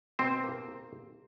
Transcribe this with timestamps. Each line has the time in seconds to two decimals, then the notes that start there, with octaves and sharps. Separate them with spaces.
0.19 B2 C4 C5
0.44 A#3